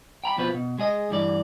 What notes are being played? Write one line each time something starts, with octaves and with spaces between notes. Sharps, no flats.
G5 A#5 B5
F2 B2 F3 B4
B2
G#3 G#4 D#5
D2 G2 E3 D5